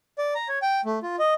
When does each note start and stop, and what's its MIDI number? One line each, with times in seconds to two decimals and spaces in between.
0.18 0.34 74
0.35 0.48 82
0.48 0.59 73
0.62 0.81 79
0.85 0.99 57
1.03 1.16 65
1.19 1.34 75